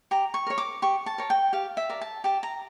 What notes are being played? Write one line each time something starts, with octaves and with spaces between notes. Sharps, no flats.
G4 A#5
C#6
A#4 C#5
D6
G4 C#6
A5
A#4 C#5
G5
G4 F5
E5
A#4 D5
A5
G4 A5
A#5